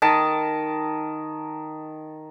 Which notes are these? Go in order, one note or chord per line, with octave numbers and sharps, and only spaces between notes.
D#3 A5